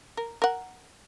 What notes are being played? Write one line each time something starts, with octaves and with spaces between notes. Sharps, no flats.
A#4
A#4 F#5